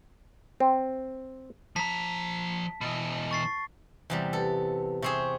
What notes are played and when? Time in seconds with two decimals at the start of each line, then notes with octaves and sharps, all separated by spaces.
0.60 C4
1.76 F3 A5 A#5 B6
2.81 B2 E3
3.31 C#6 A6 C7
4.10 E2 C3 G3
4.33 G4 A4 B4
5.02 C3 C4 G#4 C#6